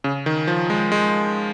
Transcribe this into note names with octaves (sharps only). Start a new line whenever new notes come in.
C#3
D#3
F3
G#3
G#3